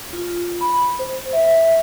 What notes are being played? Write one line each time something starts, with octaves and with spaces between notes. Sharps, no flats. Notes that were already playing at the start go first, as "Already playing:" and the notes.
F4
B5
C5
E5